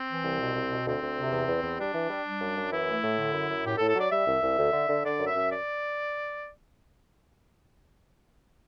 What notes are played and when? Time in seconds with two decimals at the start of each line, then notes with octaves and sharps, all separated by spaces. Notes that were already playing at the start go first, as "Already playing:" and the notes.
Already playing: C4
0.08 E3
0.24 C2
0.39 B2
0.54 C2
0.70 B2
0.85 D2 C4
1.02 D2
1.17 C3
1.32 E2
1.48 E2
1.63 E2
1.79 G3 D4
1.94 E3
2.10 G3
2.25 G3
2.41 F#2
2.57 F#2
2.71 E3 E4
2.87 A3
3.03 A2
3.18 D3
3.34 F#2
3.50 F#2
3.65 A2 G4
3.77 A4
3.80 A2
3.87 A4
3.95 F#3 D5
4.11 G3 E5
4.27 C2
4.43 C2
4.58 D2
4.73 D3
4.89 D3
5.04 D3 D5
5.20 F#2
5.27 E5
5.35 F#2
5.50 D5